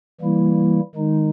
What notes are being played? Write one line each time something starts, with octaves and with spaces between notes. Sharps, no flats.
E3 G3 A#3 E4
D#3 G#3 D#4